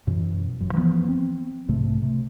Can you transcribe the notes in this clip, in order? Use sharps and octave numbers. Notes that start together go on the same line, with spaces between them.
F#2 B2 E3
G1 F#2
E3 F3 G#3 B3
C4
B1 G#2 C3 A3
C3